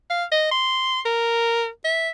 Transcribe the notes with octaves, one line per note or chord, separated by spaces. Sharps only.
F5
D#5
C6
A#4
E5